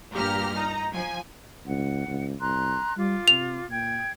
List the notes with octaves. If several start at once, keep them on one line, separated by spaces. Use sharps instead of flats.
G2 A#2 G4 A#5 F6
D#4 A#5
F3 G#5
C#2 F#5
C#2
C2 A#5 C6 F#6
G3 F4 D6
C3 F7
A#2 G5 G#6